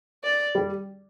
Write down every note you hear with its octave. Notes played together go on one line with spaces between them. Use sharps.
D5
G3